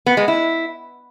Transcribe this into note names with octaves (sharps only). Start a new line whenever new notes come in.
B3
G#3
E4